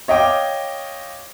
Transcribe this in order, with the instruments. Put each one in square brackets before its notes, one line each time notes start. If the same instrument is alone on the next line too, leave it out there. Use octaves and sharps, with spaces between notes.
[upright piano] C#5 D#5 F5 G5 D6